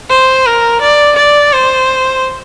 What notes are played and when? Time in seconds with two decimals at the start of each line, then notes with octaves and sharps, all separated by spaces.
0.10 C5
0.46 A#4
0.81 D5
1.16 D5
1.52 C5